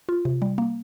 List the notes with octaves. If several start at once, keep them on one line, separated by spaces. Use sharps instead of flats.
F4
C3
G3
A#3